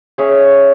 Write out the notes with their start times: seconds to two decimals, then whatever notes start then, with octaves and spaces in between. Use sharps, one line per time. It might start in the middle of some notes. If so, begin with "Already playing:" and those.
0.18 C#4 G#4 C#5 E5